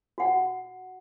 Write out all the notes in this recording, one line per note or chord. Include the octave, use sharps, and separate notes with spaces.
F#4 F#5